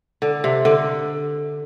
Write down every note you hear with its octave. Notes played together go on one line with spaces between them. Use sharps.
D3
C3
D3